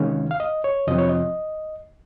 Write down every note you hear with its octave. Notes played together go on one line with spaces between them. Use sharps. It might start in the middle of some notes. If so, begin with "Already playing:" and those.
Already playing: C3 D#3 G#3 C#4 F5
F5
D#5
C#5
F2 C3 F3 C4 D#5
C#5
D#5